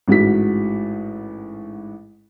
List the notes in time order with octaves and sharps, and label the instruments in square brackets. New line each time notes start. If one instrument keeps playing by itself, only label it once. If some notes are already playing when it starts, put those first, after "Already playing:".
[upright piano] A1 G#2 F#4 B6